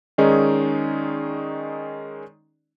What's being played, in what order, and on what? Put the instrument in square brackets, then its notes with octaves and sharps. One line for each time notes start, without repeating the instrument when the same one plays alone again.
[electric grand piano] D#3 G#3 C#4 D#4 G#4 D5